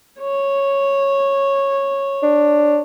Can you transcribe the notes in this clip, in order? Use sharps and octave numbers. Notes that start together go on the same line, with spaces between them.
C#5
D4